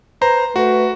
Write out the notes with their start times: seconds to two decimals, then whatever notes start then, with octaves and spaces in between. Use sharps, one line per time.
0.22 B4 C5 A#5
0.56 A3 F#4 B4